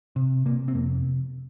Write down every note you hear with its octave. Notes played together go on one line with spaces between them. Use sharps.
C3
C3 A#3
C4
F2 A#3